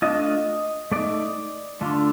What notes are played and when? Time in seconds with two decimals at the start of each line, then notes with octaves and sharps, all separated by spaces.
0.02 A3 D4 F4 D#5
0.92 A3 D#4 D5
1.81 D3 A3 D4 F4